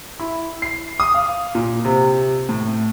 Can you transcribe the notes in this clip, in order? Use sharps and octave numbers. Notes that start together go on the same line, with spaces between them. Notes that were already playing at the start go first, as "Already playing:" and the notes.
E4
C7
D#6
F5
A#2
C3
A2